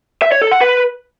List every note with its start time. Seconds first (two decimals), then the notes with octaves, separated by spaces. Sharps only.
0.22 E5
0.32 C#5
0.42 A4
0.51 F#5
0.61 B4